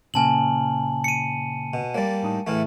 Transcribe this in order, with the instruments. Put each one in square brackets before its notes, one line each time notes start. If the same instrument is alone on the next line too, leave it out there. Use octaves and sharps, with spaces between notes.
[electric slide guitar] A#2 C#3 A#3 [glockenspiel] G#5 A5 F#7
[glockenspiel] C#7 D#7
[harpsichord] B2
[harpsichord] G3 A#3 [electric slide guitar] C#5 D5
[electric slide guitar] A2 D#4 A5
[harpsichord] A2 E3 A3 [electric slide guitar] G#4 F5